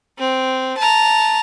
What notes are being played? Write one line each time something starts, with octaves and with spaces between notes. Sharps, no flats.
C4
A5 A#5